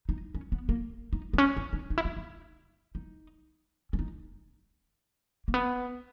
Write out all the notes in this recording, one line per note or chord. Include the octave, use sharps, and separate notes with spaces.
D#4
C#4
B3
A#3
D#4
B3
C#4
D#4
D#4
D#4
E4
D#4
D#4
D#4
C#4
D#4
A#3
B3